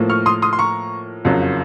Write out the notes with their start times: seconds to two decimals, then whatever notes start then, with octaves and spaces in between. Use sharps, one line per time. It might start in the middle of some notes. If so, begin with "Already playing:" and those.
Already playing: A2 F3 A#3
0.10 C#6 F6
0.26 C6 D#6
0.42 C6 D#6
0.53 C6
0.59 A#5 C#6
1.24 F#1 F2 C#3 F#3